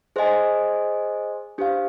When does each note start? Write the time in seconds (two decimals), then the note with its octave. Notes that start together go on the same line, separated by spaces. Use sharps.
0.16 G#4 C5 D#5 G#5
1.58 D4 G4 C5 F5